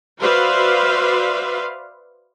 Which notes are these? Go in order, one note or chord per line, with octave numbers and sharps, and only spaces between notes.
F#4 B4 C5 D5 E5 F5